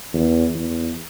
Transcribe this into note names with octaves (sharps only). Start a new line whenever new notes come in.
E2
E2